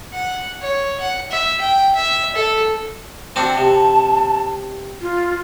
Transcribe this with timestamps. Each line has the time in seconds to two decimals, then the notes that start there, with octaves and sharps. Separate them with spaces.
0.13 F#5
0.62 C#5
1.00 F#5
1.31 E5
1.61 G5
1.96 E5
2.36 A4
3.36 C4 D4 F#4 A5
3.57 C3
5.01 F4